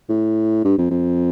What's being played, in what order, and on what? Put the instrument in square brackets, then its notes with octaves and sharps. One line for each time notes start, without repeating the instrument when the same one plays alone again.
[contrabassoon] A2
G2
F2
F2